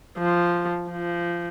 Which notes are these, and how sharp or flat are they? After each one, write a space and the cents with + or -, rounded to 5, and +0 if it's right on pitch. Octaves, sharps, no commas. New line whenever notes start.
F3 -5
F3 -20